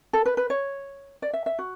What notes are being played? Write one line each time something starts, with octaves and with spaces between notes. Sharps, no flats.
A4
B4
B4
C#5
D5
E5
E5
F#4